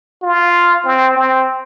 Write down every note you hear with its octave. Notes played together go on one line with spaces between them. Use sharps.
F4
C4
C4